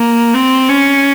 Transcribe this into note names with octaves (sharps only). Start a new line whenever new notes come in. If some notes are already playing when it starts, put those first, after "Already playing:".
Already playing: A#3
C4
C#4